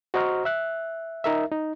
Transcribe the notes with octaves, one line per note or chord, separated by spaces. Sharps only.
F#4 C5 D#5 A#5 C#6 F6
E5 F#6
D#4 A#4 E5
D#4